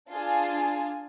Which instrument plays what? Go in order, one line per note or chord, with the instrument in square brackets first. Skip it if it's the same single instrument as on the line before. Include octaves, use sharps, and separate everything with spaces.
[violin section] D4 F4 G#4 G#5 A5